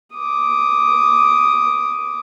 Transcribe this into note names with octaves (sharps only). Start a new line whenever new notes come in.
D6 D#6